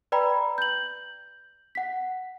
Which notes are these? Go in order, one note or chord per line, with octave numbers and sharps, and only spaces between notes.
B4 D5 G5 A#5 B5
G6 F#7
F#5 B6